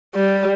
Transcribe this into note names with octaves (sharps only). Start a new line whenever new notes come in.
G3